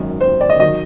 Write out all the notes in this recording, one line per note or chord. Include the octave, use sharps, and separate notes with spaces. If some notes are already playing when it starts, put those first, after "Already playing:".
Already playing: G#1 F#2 D#3
C5
D5
D#5
D#3 F#3 D#5